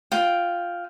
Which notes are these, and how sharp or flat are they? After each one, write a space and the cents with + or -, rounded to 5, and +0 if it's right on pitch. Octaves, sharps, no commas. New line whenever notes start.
F4 +0 G5 +0